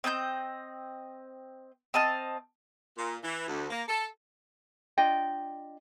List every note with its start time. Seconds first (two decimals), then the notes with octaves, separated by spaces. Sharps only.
0.04 C4 D#5 G#5 G6
1.94 C4 D#5 A5 F6
2.97 A#2
3.24 E3
3.48 D2
3.70 A#3
3.88 A4
4.98 D4 F4 D#5 G5